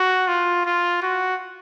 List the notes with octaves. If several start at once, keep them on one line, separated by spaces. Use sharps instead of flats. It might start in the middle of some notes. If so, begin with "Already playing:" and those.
Already playing: F#4
F4
F4
F#4